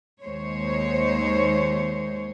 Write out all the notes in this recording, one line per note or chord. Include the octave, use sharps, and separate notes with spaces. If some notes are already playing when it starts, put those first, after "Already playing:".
D#2 G#3 C5 C#5